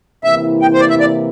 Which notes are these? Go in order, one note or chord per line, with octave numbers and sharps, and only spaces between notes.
C3 E3 A#3 E4 E5
G5
C5
D5
E5
D5